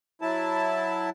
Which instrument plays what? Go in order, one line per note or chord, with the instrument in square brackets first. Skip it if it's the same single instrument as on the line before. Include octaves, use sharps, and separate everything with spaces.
[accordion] F#3 E4 A5